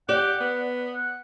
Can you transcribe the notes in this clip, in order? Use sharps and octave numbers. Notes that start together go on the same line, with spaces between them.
G4 D5 F#5
B3
F#5